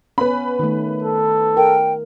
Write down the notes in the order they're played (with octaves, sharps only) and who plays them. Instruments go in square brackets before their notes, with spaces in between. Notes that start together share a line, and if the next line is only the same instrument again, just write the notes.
[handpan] B3 C#4 [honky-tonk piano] B4 B5
[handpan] D#3 A3
[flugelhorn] A4
[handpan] A#4 [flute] G5